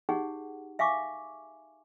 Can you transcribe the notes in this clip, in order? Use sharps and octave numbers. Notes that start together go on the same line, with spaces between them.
D#4 G4 G#4 C#5 F#5
E5 F5 G#5 C#6 D6